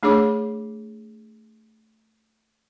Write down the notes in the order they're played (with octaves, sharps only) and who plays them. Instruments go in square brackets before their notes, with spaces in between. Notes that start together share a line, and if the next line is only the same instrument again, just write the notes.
[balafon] A3 D4 G#4 C#5 D6